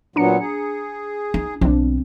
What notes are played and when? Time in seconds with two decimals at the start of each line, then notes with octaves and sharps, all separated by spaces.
0.16 A#2 F#3 B3 D4 A#5 C#7
0.40 G#4
1.34 D#4
1.61 B1 D3 C4 D4